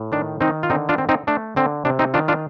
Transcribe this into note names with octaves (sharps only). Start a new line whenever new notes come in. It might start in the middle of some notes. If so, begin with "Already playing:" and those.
Already playing: A2
D#3 D4
D#3 C4 D#4
F4
D3 C4 D#4
D4 F4
C4
C4 D#4
A3 D4
D3 C4
C3 D4
C4 D#4
D#3 D4 F4
D4 F4